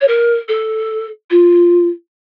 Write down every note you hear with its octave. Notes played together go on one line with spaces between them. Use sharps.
C#5
A#4
A4
F4